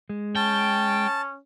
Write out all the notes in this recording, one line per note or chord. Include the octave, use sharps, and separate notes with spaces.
G#3
C#4 G5 A5